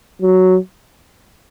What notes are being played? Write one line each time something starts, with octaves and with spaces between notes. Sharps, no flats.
F#3